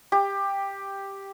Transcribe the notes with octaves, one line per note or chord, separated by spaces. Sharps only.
G4